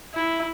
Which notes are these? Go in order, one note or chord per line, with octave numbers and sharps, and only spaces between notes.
E4